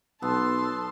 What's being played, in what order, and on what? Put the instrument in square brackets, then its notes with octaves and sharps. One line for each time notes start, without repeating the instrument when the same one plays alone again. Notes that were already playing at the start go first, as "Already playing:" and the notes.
[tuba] B1 [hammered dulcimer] B3 A4 [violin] A5 C6 [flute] E6